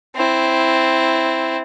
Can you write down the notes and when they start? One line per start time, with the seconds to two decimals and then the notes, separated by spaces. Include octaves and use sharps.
0.16 C4 E4